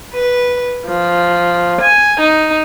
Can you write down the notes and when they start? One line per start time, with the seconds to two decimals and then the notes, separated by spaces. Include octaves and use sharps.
0.14 B4
0.86 F3
1.81 G#5
2.21 D#4